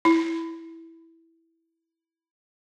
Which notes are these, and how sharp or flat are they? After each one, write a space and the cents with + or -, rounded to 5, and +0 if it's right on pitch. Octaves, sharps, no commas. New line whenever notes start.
E4 -5